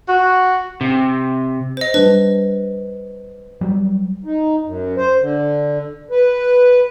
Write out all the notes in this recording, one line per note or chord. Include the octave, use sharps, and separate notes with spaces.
F#4
C3
C5 D#5
G3 G#3 D4 B4
F#3 G3
D#4
F#2
C5
D3
B4